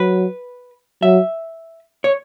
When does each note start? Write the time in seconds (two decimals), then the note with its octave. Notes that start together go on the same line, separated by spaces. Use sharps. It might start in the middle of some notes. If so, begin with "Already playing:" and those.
Already playing: F#3 B4
1.02 F#3 E5
2.04 C#5